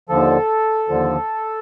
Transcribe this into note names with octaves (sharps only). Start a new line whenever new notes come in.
D#2 D3 F3 A4
D#2 D3 F3